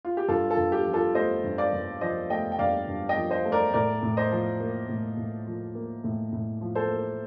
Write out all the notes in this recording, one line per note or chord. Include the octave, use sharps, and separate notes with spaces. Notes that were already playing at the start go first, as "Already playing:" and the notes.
F4
G4
G2 F4 A4
F4 A4
G2
G4
F3
F4 A4
A3 C5 D#5
G2
D5 F5
G2
F3 C5 D#5
A3 D#5 G5
G5
G2 D5 F5
G2
D#5 G5
F3
C5 D#5
A3
A#4 D5
A2 A#4 D5
A2
C5 D#5
F3
A#3
A2
A2
F3
A#3
A2
A2
F3
A4 C5
A#3